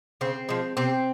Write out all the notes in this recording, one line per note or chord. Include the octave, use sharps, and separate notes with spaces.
C#3 C4
F3 G#3
C3 C4